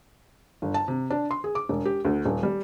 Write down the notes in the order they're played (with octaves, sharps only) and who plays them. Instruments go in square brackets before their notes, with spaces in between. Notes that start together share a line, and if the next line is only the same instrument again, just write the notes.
[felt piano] G1
A5
C3
D4
C6
G#4
D6
E1
G4
D2
D#1
G3